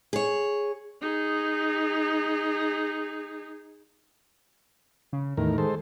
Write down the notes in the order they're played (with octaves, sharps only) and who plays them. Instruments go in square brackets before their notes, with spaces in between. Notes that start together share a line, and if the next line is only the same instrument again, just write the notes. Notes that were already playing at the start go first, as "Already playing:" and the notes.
[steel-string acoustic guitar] G#4 C#5
[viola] D#4 G#4
[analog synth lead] C#3
[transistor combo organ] E2 A2 A#4 [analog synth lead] D#3
[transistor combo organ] G#3 A4 C5